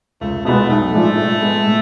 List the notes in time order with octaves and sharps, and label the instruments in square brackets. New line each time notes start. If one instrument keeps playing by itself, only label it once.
[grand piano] C#2 [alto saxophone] A3
[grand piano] B2 G#3 B3 [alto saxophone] A3
[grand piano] B1 [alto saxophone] A3
[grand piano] A2 F3 G#3 D4
A2
G#3 B3
A2